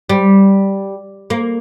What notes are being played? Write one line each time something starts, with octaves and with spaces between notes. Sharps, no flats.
G3
A#3